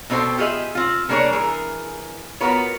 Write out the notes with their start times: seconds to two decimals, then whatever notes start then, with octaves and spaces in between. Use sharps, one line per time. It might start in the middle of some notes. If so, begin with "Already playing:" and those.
0.10 B2 C4 D#4 A4 C5 G5
0.38 F4 G4 G#4 D#5 E5
0.75 C4 F4
1.09 G3 A#3 D4 G#4 A#4 C#5
1.32 E3 G#4 A#4
2.41 B3 F4 F#4 A#4 B4 C#5